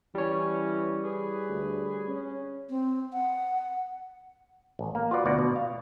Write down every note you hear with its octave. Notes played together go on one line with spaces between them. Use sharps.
E3 G3 C#4 C#5
G#4 B4
D2
C#4
C4
F#5
A1
A#3
F4 F#4 B4 D5
D2 B2 F#4 D5
B2
F5